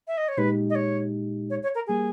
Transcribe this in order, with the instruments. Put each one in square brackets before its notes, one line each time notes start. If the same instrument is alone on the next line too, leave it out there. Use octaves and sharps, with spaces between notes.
[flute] E5
D#5
C#5
[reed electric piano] A#2 G#3 D#4 G4 [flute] B4
[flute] D#5
C#5
C#5
C#5
A#4
[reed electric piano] G3 A#3 [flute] G#4